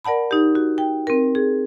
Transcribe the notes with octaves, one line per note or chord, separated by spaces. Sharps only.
A#4 D5 F#5 A5 B5
D#4 G4
F#4
G5
C4 A#4
G#4